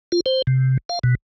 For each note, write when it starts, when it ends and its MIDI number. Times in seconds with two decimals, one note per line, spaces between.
0.12 0.20 65
0.26 0.42 72
0.47 0.77 48
0.89 0.99 77
1.04 1.15 47